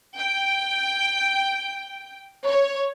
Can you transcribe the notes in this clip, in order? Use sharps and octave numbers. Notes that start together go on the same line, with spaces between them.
G5
C#5